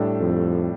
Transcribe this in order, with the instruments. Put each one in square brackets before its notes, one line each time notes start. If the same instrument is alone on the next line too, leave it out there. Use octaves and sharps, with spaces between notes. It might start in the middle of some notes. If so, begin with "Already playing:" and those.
Already playing: [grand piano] A2 G3 D4 A4
[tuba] F2